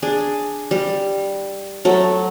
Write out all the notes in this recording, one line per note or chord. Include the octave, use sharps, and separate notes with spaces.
D4 G#4
G3
F#3 A3